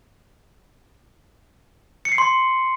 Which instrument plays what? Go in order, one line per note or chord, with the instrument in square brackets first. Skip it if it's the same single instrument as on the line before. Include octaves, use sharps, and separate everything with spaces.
[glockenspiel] C#7
C7
C6